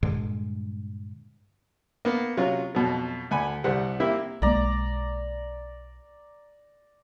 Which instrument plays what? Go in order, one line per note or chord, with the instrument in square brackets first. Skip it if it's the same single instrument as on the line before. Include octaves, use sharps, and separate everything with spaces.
[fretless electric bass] G2 A#2 D3 G#3
[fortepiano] A#3 B3
C3 F#3 C#4 F4
F2 B2 F#3
D2 G#5 B5
C2 G3 C5 F#5
A#3 C4 E4 G4 E5
[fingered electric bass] B1 G#3 A#3 [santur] D5 A#5